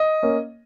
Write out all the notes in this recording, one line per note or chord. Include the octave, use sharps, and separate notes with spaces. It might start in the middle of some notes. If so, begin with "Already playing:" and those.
Already playing: D#5
A#3 C#4